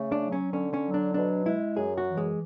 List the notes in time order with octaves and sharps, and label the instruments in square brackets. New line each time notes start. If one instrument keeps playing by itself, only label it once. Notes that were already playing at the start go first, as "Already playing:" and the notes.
Already playing: [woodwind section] C#3 A3
[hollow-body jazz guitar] D4
[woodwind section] F#3
[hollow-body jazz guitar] C#4
[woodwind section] D3 [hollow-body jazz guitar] C#4
[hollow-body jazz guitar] C#4
[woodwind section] F#3
[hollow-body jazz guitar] D4
[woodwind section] B2 [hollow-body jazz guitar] D4
[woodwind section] G#3 [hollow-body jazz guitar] E4
[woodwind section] F#2 [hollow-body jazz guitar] G#4
[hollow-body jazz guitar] F#4
[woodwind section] E3
[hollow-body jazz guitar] G#3